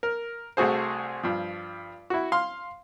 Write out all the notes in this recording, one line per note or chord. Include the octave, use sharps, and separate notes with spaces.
A#4
C2 A3 F#4 G#4 C5
G2 F3
E4 F#4
F5 C6